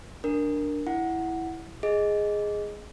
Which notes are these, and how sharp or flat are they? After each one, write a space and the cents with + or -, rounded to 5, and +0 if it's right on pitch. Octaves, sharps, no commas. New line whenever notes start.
D4 +0 A#4 +0
E4 +0 F#5 +0
G#4 +0 D#5 +0